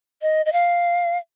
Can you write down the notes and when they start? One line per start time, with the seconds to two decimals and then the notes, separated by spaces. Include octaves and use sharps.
0.22 D#5
0.46 D#5
0.53 F5